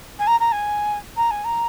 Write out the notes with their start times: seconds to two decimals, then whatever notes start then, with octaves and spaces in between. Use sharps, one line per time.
0.19 G#5
0.27 A#5
0.40 A#5
0.52 G#5
1.16 A#5
1.30 G#5
1.44 A#5